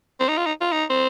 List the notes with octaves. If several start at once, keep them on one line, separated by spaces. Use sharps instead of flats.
C4
D#4
F4
D#4
F4
D#4
C4